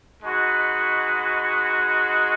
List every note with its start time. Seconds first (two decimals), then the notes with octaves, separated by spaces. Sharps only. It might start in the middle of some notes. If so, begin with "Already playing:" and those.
0.23 G#3 D#4 F#4 B4